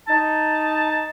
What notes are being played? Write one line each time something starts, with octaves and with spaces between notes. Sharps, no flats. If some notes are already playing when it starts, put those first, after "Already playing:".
D#4 A5